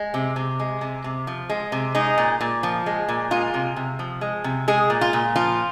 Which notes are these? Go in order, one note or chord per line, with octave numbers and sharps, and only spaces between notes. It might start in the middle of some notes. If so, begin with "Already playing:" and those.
Already playing: G#3
C3
C3
G#3
C3
C3
F3
G#3
C3
G#3 D#4
A#2
A#2
F3
G#3
A#2
G#3 F4
C3
C3
F3
G#3
C3
G#3 G#4
A#2
F4
A#2
F3 F4